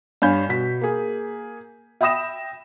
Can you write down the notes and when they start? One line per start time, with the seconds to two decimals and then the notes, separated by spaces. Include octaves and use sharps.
0.22 G2 C#5 F5 G#5 B5 G6
0.49 B2 B6
0.81 A#3 G#4
2.01 E5 G5 B5 D#6 A#6 E7